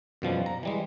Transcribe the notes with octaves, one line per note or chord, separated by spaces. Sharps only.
F#2 B2 F3 G3
A#5
E3 G3 G#3